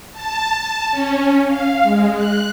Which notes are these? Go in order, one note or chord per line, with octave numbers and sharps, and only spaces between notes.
A5
A5
C#4
F5
G#3
F#6